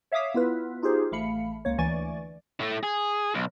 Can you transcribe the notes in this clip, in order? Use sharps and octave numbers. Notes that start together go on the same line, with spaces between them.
C#5 E5 F5 D6 D#6 B6
B3 E4 F4 B4
D#4 F4 G4 G#4 C5
A1 A3 F5 B5 C#7
C#2 A#3 C#5
D2 E3 D5 G#5 C#6 A6
A2 A3
G#4
B1